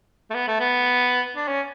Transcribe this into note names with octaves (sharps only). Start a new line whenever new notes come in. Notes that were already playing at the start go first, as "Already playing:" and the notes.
A3
B3
A3
B3
D4
C#4